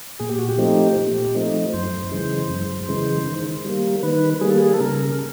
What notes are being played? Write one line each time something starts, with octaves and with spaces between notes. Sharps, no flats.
A#2 G#4
G4
F#4
G4
F3 A3 C4 D#4
A#2
F3 A3 C4 D#4
F#2 C5
C#3 E3 G#3
F#2
C#3 E3 G#3
D#3
G3 A#3
D#3 B4
G3 A#3 G#4
A4
G#4
A4
C#3 A#4